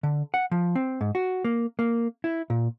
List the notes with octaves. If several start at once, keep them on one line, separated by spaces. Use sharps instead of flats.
D3
F#5
F3
C4
G#2
F#4
A#3
A#3
E4
A#2